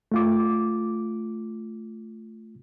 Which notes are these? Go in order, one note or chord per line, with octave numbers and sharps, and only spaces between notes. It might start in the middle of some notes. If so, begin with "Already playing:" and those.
A3 F4 D6